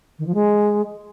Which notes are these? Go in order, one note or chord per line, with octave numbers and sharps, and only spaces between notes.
D#3
F3
G#3